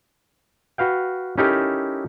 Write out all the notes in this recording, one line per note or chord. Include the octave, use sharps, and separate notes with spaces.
F#4 B4 F5 G5
C#4 D#4 E4 G4 A4 A#4